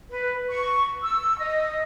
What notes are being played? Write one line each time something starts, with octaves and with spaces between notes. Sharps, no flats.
B4
C#6
E6
D#5